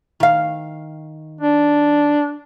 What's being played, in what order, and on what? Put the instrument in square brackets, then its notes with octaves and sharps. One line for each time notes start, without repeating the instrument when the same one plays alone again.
[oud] D#3 F5
[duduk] D4